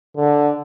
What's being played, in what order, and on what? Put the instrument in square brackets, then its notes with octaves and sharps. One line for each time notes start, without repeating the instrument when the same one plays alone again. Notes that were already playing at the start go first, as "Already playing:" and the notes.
[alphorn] D3